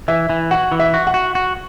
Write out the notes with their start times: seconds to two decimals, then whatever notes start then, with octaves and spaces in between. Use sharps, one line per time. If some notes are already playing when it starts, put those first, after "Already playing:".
0.08 E3 E5
0.29 E3
0.51 F#4 F#5
0.72 E3
0.80 E5
0.94 F#4
1.07 F#5
1.14 F#4
1.35 F#4